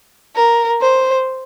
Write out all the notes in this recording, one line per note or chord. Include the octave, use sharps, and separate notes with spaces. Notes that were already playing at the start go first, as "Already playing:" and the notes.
A#4
C5